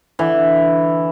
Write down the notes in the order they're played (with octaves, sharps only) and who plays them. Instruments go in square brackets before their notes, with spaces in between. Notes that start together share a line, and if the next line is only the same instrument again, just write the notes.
[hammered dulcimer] D3 E3